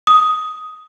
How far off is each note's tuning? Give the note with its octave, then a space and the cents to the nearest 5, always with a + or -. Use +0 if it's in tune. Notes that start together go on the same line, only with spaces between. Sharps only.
D#6 +10